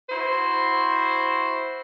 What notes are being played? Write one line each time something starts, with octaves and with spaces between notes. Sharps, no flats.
E4 F#4 C5